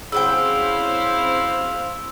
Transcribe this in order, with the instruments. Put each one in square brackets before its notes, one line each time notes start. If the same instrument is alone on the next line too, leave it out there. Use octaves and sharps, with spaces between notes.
[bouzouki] C#3 F#3 G5 [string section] C4 E4 C5 [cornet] F5 [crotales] E6